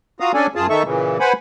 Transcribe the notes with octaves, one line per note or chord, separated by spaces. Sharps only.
F4 F#4 F5 A#5 D#6
C#4 D4 A4 D5 G#5
F#2 F4 G#4 A5
D#3 D#4 A4 E5 C#6
A#2 C#3 E3
B4 C5 F#5 G#5 B5